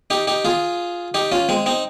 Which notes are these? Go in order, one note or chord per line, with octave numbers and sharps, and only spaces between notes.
D#4 G4
D#4 G4
F4 G#4
D#4 G4
C#4 F4
G#3 C4
C4 D#4